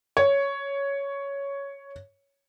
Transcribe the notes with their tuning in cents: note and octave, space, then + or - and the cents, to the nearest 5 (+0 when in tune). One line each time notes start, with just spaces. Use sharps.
C#5 +5